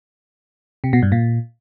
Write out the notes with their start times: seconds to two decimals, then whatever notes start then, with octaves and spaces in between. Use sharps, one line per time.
0.84 C3
0.93 B2
1.02 G2
1.12 A#2